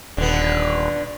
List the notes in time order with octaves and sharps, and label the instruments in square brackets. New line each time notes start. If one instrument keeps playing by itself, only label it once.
[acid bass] D#1 [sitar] D3 B3